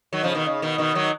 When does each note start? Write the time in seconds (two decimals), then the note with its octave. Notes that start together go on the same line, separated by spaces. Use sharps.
0.13 D#3 F#3
0.23 C#3 F3
0.35 B2 D#3
0.46 C#3
0.62 B2 D#3
0.78 B2 D#3
0.95 D#3 F#3